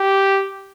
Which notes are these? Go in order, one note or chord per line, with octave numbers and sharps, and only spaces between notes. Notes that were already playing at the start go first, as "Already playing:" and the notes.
Already playing: G4